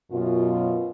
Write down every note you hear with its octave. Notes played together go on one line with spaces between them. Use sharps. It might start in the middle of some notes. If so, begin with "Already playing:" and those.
F#2 B2 F4